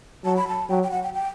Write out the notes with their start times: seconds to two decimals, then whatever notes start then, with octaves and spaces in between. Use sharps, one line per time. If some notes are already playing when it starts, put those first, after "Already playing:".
0.25 F#3 A5
0.37 B5
0.48 A5
0.69 F#3 G5
0.83 G5
0.92 F#5
1.03 G5
1.14 G5